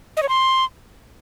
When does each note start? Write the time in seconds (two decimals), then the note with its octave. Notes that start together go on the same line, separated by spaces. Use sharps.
0.17 D#5
0.23 C#5
0.29 C6